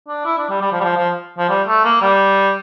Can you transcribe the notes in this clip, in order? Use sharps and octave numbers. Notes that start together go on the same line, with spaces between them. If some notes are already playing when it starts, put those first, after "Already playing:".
D4
E4
D4
G3
G3
F3
G3
F3
F3
F3
G3
A3
A#3
G3